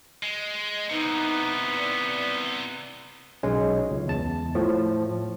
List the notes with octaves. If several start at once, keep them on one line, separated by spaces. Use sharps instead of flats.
G#3
C3 E3 B3 D#4
D5
B1 G#3 C#4
C#2
E2 A5
A2 F3